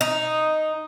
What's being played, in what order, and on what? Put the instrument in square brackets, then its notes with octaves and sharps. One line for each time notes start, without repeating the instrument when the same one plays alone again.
[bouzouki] D#4